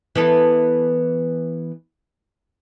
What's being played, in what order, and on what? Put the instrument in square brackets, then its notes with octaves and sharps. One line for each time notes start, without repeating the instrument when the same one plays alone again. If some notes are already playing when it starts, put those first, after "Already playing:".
[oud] E3 B3 A4